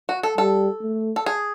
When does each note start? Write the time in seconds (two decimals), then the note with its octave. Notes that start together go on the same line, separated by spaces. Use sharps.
0.09 F#4
0.23 A4
0.38 G3 A4
0.82 A3
1.16 A4
1.26 G#4